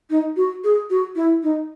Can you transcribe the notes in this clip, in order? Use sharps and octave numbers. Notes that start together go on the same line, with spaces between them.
D#4
F#4
G#4
F#4
E4
D#4